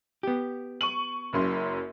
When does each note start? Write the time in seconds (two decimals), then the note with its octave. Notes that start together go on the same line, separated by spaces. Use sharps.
0.23 B3 G4
0.81 C#6 D#7 F#7
1.33 F#1 F#2 C6